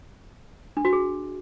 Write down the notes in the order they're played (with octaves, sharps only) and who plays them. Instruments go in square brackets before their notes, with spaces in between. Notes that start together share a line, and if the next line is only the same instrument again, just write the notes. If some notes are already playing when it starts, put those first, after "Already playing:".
[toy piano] D4
F#4
G#4